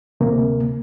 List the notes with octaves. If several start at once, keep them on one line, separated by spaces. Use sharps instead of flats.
D2 C3 A#3